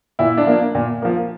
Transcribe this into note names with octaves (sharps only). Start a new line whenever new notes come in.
A#2 E4
D4
F3 A#3
A#2
F3 A#3